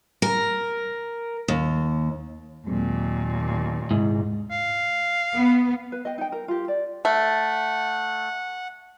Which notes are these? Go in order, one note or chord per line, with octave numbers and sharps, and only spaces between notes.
A#4
D#2
D#2 A#2 F#3 G#3 C4
G#2 C3 E4 G#4
F5
B3
B4
D#5 G5
D#4 G5
A#4
F4 G4
D5
A3 F#5